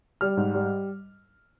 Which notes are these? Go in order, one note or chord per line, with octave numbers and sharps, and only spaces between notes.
G3 F6
G#2
G3